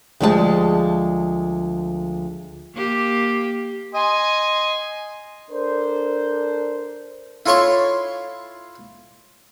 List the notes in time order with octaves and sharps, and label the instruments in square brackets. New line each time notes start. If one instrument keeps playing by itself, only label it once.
[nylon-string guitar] D2 F3 G3 G#3 F5 A5
[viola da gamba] A#3 G4
[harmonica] D#5 G#5 C6
[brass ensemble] D4 A4 A#4 C5
[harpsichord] E4 F4 A4 C#5 C6 C#6